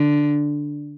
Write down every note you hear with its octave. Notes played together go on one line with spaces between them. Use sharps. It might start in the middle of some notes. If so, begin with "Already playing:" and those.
Already playing: D3